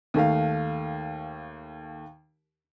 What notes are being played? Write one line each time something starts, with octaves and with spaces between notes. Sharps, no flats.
D#2 A3 F5